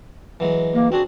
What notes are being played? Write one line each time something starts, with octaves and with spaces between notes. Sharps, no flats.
E3 F#3 G#3
A#3
C4 D4 F#4 G#4